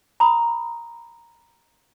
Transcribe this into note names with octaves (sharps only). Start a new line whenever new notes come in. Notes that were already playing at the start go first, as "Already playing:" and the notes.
A#5 B5 D#6